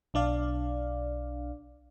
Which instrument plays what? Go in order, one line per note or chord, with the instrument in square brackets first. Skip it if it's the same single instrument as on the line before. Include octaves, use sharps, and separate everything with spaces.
[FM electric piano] B1 D4 D5 F5